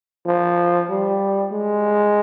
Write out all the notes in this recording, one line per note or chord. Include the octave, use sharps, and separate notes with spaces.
F3
G3
G#3